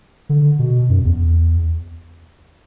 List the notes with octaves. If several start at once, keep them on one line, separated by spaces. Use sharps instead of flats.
D3
B2
F#2
E2